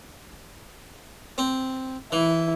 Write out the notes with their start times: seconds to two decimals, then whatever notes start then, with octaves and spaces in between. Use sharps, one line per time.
1.38 C4
2.12 E3 E4